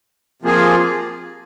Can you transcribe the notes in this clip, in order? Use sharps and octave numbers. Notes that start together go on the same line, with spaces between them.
C3 F3 A#3 F4 G#4